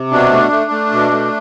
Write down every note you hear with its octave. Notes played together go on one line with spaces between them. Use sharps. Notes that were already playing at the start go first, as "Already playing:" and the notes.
Already playing: C3
B2 D4
A3
A3
A3
B2
A3